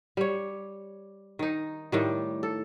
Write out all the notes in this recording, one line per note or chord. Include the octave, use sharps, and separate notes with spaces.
G3 C#5
D#3 D#4
A2 D#3 G3
A4